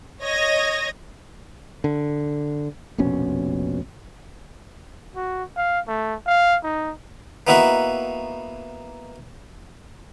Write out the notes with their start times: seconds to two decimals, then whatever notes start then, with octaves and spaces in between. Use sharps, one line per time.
0.23 C#5 D#5 G#6 A#6
1.84 D3
2.98 F1 A#1 B2 C#4
5.16 F#4
5.56 F5
5.88 A3
6.26 F5
6.63 D#4
7.47 A#3 B3 D#4 E4 F#4 E5